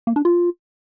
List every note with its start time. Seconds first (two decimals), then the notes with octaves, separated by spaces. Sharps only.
0.07 A#3
0.16 D4
0.25 F4